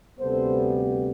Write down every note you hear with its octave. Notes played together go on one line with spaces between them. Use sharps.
D2 C3 G3 B3 A4 C5